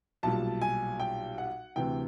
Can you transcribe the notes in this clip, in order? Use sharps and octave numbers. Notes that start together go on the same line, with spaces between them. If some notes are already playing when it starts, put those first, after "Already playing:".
B1 A#2 G3 A5
G#5
G5
F#5
D2 C3 E3 G5